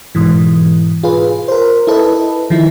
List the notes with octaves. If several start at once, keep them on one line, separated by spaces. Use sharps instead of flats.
G#2 B2 E3
F4 G#4 B4
A#4 C5
E4 A4 B4 D#5
D#3 F3 E4